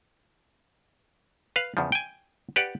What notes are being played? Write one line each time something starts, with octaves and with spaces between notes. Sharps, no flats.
B4 F5
E2 C#3 F3
G5 G#5
G4 B4 D5 F#5